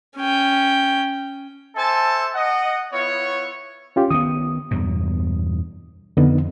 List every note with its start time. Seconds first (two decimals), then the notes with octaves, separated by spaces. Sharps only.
0.16 C#4 G5
1.75 A4 C5 E5 G#5 A5
2.33 D#5 F#5
2.92 B3 E4 F4 C#5
3.96 C#4 F4 G4
4.11 D#3 B3 D#6
4.71 E2 G2 B2
6.17 F2 D3 B3 D#4